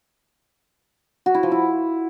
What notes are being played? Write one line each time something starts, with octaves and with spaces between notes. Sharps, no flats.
F#4
E4
F3
E4